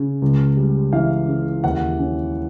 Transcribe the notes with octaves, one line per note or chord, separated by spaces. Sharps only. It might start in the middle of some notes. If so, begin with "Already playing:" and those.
Already playing: C#3
C#2
G3
E3 F5
C#3
D#2 F#5
C#4